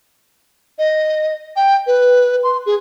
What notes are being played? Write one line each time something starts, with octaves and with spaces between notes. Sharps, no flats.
D#5
G5
B4
C6
G#4